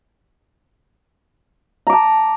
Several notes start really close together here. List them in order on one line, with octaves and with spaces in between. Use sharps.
A#5 D6 A5